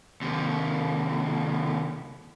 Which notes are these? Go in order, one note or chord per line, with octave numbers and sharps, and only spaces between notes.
D#2 C3